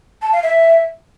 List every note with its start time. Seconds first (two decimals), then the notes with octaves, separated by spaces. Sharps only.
0.22 A5
0.33 F5
0.43 E5